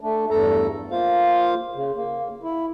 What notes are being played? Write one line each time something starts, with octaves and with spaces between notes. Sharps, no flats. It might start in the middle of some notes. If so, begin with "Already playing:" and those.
A3 D4
E2 G2 A3 A4 A#5
A#3 F4 C5 F5
C#3
A#3
E4